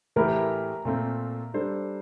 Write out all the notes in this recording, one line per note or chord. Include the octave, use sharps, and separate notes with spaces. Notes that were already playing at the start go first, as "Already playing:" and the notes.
A2 E3 A3 E4 G4 A#4
A#2 A3 C4
G3 D4 A4 C5